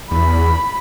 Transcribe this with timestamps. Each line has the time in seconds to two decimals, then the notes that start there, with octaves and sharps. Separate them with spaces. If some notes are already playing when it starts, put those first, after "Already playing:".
0.11 E2 B5